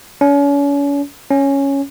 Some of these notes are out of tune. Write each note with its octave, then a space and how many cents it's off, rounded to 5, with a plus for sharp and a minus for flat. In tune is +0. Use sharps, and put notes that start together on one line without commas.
C#4 +40
C#4 +0